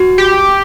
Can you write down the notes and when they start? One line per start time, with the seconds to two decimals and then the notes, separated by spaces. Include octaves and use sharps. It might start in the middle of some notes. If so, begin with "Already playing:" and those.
Already playing: F#4
0.18 G4